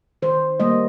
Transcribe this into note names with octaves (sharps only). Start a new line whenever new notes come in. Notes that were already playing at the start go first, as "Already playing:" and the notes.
D#3 C5
G3 A#3 D#5